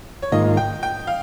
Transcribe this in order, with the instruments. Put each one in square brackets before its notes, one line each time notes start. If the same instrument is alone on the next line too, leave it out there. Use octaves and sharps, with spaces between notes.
[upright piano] C#5
[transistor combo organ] G#2 D#3 A#3 F4 [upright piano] D#5
[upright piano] G5
G5
F5